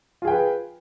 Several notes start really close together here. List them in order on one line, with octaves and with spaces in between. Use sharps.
F4 G#4 G5 B4